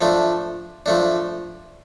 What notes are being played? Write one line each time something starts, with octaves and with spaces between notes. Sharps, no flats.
F3 A3 D4
F3 A3 D4